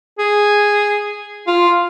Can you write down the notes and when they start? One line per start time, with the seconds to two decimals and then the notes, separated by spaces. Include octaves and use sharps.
0.19 G#4
1.47 F4